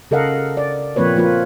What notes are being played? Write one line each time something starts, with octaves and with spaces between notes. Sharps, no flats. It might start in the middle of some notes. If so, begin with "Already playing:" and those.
C#3 A4 A#4 D#5 F5 F#5
D5
A#2 F3 A#3 C4 B4 C#5
F3 A#3 F4 B4